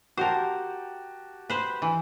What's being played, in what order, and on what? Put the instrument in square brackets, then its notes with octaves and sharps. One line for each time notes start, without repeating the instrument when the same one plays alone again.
[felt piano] F#4 G4 A5 [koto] A#4 C5
[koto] B4 C5
E3